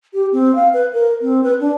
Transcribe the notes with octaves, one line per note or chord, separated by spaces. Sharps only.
G4
C4
F5
B4
A#4
C4
B4
D4